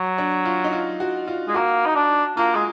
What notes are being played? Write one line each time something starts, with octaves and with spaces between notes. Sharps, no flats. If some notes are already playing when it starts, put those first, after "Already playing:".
Already playing: F#3
D4
F4
D#4
F4
F#4
F4
G#3
A#3 F#4
D#4
D4
A#3 F4
G#3